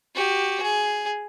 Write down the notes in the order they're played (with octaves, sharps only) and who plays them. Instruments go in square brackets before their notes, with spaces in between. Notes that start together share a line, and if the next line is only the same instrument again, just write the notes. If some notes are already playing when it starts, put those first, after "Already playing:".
[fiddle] F#4 G4
G#4